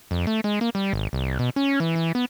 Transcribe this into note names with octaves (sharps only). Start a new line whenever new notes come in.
F2
A3
G#3
A#3
G3
G#1
C2
B2
C#4
E3
E3
B3